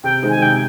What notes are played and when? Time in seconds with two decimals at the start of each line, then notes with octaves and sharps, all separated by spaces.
0.04 C3 G5
0.23 D#3 G#3 C4 D#4
0.30 G#5
0.42 C3 G5